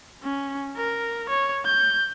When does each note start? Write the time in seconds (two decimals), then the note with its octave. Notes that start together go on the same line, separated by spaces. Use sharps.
0.23 C#4
0.76 A#4
1.29 C#5
1.65 G6